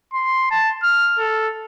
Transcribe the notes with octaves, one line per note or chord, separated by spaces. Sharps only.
C6
A5
F6
A4